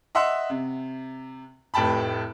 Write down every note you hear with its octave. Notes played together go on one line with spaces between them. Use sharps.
D#5 E5 F#5 C6 E6
C3
F1 A2 G5 A5 B5